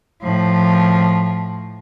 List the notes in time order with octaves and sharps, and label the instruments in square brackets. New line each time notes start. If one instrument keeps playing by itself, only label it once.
[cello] A2 F3